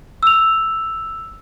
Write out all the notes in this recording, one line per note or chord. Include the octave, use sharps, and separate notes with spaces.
E6 F7